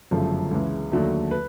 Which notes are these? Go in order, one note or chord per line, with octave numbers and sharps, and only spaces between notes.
G1 F#2 C#3 F3 A3
C#2 C#3 E3 G#3
D#2 D3 F#3 A3
B4